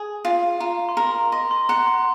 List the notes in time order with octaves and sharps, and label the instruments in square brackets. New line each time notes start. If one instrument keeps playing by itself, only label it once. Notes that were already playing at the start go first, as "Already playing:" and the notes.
Already playing: [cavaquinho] G#4
F4
[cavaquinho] F4 [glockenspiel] A#5
[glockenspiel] C6
[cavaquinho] A#4 [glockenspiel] A#5
[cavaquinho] D#5 [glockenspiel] C6
[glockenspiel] C6
[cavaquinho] F#5 [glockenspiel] A#5
[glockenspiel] C6